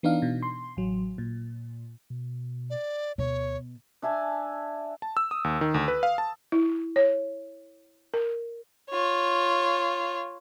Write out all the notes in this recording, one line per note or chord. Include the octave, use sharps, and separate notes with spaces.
E3 B3 D4 D#4 F5
B2
C6
A1 F#3
A#2
B2
D5
D2 B2 C#5
D4 E5 G#5 A5
A5
E6
D#6
D#2
D#3
D2
B4
F5
A5
E4
C#5
A#4
F4 C#5